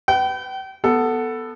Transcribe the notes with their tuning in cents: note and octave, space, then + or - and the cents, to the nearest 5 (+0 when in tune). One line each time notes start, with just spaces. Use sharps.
B4 +15 G5 -35
B3 +0 A4 +10